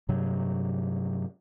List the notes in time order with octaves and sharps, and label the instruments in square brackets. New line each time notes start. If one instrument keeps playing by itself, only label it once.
[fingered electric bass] G2 C3 F#3